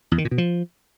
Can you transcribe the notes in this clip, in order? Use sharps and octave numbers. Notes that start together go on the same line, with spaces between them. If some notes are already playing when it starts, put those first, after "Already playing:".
E2
D#3
A#2
B2
F3